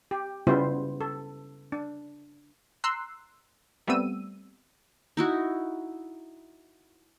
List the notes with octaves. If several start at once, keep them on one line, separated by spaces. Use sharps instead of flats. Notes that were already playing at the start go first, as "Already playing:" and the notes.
G4
C#3 G3 B3 E4 F4 C5
A4
D4
A#5 C6 E6 F#6 C7
G3 A3 B3 C4 E6 D#7
D#4 E4 F#4